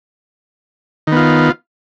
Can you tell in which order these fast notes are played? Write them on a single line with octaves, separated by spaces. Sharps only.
D#3 B3 F4